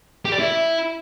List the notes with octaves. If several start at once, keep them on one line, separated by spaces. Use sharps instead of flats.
G4
D5
E4